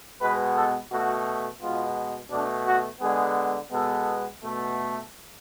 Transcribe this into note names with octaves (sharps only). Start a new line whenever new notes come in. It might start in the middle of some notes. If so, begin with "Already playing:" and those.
B2 G#3 B3 B4
A4
B2 A3 F#4
B2 G#3 B3 F4
B2 A3 D4
F#4
D3 G#3 B3 G#4
B2 G#3 B3 A4
B2 A3